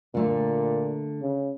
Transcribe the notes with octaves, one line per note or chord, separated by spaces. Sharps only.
A#2 D3 A3
C#3